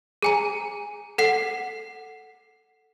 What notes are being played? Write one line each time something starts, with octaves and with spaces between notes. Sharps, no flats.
G#4 G#5 A#5
A4 F#5 C7